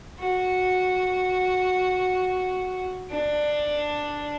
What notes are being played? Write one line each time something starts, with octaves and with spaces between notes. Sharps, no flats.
F#4
D4